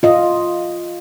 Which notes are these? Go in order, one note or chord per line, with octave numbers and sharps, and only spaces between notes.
F4 D#5